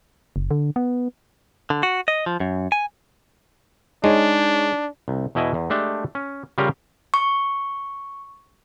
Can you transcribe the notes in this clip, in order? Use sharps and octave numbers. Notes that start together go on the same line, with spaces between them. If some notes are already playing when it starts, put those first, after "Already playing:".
F#1
D3
B3
D3
F#4
D#5
F3
F#2
G#5
G#3 D4 D#4 C#5
C2
E2 B2 E4 D#5 G#5
E2
G#3 A3 D4 G4
C#4
C#3 G3 F4 G4 A#4 C#5
C#6